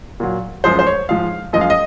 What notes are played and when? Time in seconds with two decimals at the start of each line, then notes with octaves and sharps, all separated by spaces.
0.20 A#2 F#3
0.64 F#2 F3 G#3 C5
0.79 C5
0.87 C#5
1.09 G#2 F3 G#3 F5
1.53 F#2 F3 G#3 D#5
1.61 F5
1.70 D#5